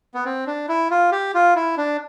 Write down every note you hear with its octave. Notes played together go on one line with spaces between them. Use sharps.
B3
C4
D4
E4
F4
G4
F4
E4
D4